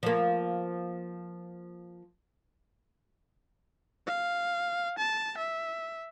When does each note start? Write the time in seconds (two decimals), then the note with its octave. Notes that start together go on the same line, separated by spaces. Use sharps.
0.03 F3 A#3
4.07 F5
4.98 A5
5.38 E5